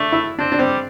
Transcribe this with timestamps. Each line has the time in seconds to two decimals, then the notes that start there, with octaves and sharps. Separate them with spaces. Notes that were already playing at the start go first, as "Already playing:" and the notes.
Already playing: A3 D4
0.12 E4
0.39 C4 D4
0.52 D4
0.59 G3 C4